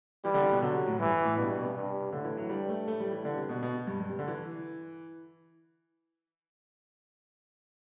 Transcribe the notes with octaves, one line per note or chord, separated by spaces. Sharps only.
E3 G3
D3
C3
B2
D3 F#3
C3
A2
G2 E3
A2
G2 B2
B2
C3
G2
A2 D3
E3
F#3
G2 G3
A3
A2 A3
G3
E3
G2 D3
C3
B2
B2
G2
G2
C3
D3
E3